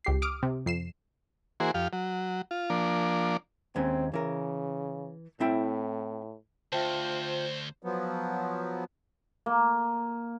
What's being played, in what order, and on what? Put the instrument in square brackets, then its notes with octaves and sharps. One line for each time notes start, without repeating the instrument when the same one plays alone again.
[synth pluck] C#2 G4 C7
D6 D#6 F6 D7
C3
F2 C7 E7
[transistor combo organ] E3 A#3 F#4 G#4 C5
F2 G4 F5
F#3
F4
F3 A#3 D4
[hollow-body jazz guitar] D#2 G#3 C#4 [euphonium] C4
[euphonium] C#3 [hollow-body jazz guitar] E3 A#4
[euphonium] A2 [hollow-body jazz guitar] C4 E4 G5
[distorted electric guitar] D2 [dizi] F4 [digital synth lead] C5 [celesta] E5 G5 A5
[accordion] F3 F#3 B3
[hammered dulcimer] A#3